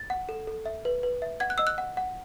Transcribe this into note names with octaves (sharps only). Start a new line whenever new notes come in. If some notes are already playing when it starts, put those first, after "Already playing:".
Already playing: A6
F#5
A4
A4
E5
B4
B4
E5
F#5 G#6
F#6
D#5 E6
F#6
F#5
F#5